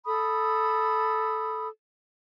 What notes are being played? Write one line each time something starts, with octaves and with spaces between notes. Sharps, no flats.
A4 B5 D#6